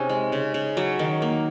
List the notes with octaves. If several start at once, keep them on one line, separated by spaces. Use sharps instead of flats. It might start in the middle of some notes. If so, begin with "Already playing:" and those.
Already playing: C3 C#4 D#4 G#4
G#3
C#3
C#3
F#3
D#3
A#3